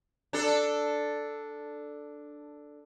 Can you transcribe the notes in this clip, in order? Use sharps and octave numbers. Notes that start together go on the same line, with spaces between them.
D4 A4